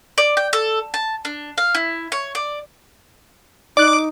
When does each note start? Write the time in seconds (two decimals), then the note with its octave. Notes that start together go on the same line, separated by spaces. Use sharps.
0.18 D5
0.37 G5
0.53 A4
0.94 A5
1.25 D4
1.58 F5
1.75 E4
2.12 C#5
2.35 D5
3.77 D#4 D5 D6 F#6